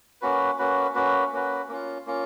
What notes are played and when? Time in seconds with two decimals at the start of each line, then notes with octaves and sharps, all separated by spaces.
0.22 A#3 C#4 F#4 B4
0.58 A#3 C#4 F#4 B4
0.95 A#3 C#4 F#4 B4
1.33 A#3 C#4 F#4 B4
1.68 A#3 C#4 F4
2.07 A#3 C#4 F4